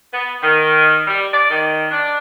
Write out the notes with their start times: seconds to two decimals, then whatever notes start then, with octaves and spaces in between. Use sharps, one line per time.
0.13 B3
0.42 D#3
1.07 G3
1.33 D5
1.50 D#3
1.90 D4